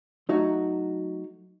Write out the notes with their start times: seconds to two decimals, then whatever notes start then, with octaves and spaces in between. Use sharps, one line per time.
0.29 F#3 A3 D#4 F#4